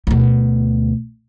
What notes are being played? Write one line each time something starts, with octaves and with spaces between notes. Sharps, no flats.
D2 B2